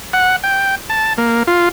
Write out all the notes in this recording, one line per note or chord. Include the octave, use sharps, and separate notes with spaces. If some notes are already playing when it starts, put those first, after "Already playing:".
F#5
G5
A5
A#3
F4